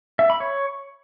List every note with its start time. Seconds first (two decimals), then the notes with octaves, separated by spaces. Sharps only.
0.19 E5
0.30 B5
0.40 C#5